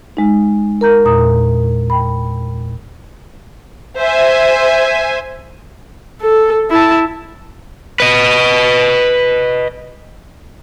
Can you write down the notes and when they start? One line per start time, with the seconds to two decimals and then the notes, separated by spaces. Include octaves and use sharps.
0.17 G#3 D#4
0.81 A#4 A#5 G6
1.05 E2 A#2 A#5 D#6
1.90 G5 B5
4.00 C5 E5 G#5
6.22 A4
6.71 E4 A5
8.00 B4 D#5